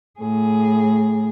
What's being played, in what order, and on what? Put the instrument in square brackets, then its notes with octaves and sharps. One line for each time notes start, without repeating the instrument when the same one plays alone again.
[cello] A2 G#4